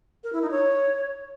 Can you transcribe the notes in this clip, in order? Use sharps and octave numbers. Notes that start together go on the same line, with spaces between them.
A#4
E4
D#4
C#5